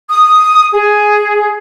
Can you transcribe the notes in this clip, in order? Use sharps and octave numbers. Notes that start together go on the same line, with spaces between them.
D#6
G#4